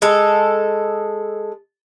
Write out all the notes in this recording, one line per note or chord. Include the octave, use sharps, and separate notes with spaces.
G#3 A4